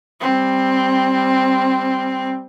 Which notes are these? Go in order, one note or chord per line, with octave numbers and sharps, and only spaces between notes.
G3 C4